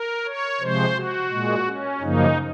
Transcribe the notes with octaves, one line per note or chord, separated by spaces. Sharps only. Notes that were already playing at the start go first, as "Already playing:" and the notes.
Already playing: A#4
C#5
C3 F3 G#3 C5
F#4
A#2 G#3
C#4
F#2 C#3 F3 A#3 D#4